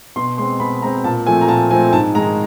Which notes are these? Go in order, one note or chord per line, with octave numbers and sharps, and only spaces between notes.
B2 C6
G#3 C4 C6
B2 B5
G#3 C4 A#5
A#2 A5
F3 A3 C4 G#5
A#5
A#2 A5
F3 A3 C4 G#5
G#2 A5
D#3 G#3 A#5